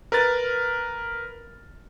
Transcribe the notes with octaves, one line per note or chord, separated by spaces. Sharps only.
A#4 B4 F6 A6